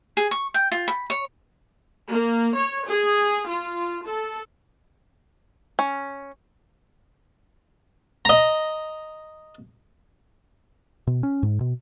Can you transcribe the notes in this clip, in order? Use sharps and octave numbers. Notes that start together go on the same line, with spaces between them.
G#4
C#6
G5
F4
B5
C#5
A#3
C#5
G#4
F4
A4
C#4
D#5 A#5
B2
C#4
G#2
B2